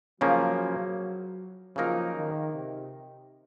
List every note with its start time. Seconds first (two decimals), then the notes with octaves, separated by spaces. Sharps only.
0.21 C#3 F3 F#3 A#3 C#4
1.76 C#3 F3 F#3 A#3 D#4 A#4
2.15 D#3
2.54 C3